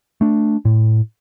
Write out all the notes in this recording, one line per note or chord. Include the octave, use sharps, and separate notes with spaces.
A3 D4
A2